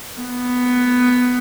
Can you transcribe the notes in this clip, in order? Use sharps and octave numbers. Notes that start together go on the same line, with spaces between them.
B3